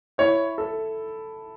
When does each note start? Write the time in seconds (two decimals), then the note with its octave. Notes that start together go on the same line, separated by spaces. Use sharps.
0.18 E4 C#5
0.58 A4